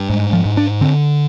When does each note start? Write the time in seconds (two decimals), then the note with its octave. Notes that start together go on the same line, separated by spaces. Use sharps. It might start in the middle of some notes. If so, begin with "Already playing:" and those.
Already playing: G2
0.10 G#2
0.33 F3
0.45 G#2
0.57 D4
0.81 D3 C4